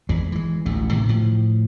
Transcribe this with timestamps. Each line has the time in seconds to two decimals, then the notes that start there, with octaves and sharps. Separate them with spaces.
0.09 G#1 E2 E3 G#3
0.32 E3 G#3
0.66 A1 D2 A3
0.90 A2 C3 D#3 E3
1.09 A2 F3